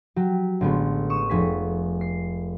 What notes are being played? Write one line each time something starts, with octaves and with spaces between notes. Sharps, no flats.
F#3 G4
A1 D3 G#3 B3
C#6 D#6 E7
F1 G#4 B6
C7